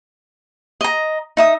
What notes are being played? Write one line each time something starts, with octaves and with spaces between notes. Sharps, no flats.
D#5 A#5
D#4 E5 D#6